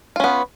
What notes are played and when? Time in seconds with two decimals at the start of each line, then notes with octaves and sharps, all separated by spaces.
0.16 F4
0.20 C#4
0.24 B3